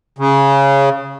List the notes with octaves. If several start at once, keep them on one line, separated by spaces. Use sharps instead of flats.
C#3